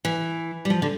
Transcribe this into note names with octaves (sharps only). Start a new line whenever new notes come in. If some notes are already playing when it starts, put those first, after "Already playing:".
E3
G3
F3
D3